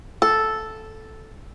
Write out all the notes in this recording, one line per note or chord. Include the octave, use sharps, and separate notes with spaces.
A4